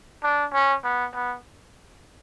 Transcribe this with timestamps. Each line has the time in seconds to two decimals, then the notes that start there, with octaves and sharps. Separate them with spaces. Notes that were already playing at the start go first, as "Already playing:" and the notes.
0.24 D4
0.54 C#4
0.85 B3
1.15 B3